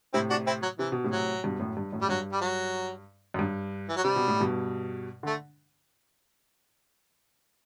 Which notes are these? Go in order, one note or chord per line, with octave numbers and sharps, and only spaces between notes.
A2 C3 C4 E4
D4 F#4
C4 E4
F#3
C3 E3
B2
A2 C3
F#3
G2 B2
F#2 A2
G2
F#2 A2
G3
G2 F#3
G3
F#3
F#2
G2
E3
F#3
C3 G3
B2
A2
G2 B2
D3 A3